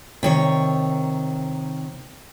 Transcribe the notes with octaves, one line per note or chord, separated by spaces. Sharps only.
C3 D#3 C#5